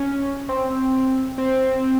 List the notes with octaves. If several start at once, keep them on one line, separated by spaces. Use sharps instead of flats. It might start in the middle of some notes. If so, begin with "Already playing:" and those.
Already playing: C#4
C4
C4